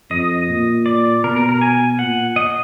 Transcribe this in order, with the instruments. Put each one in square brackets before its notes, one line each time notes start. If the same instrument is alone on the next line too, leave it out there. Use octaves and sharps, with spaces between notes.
[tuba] F2 [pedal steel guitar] D#5
[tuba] A#2
[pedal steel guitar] D5
[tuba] B2 [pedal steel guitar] A#4
[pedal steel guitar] A#4
A#4
G#5
[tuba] A#2 [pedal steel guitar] F#5
[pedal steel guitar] D#5